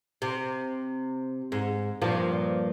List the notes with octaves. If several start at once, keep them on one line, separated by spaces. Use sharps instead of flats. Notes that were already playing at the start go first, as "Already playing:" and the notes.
C3
G#2
G2 A#2 F3